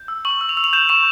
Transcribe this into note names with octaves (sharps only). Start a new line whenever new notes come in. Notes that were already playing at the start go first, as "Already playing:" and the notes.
Already playing: G6
E6
C#6 F#7
E6
F7
E6
F7
G6 E7
C#6 E7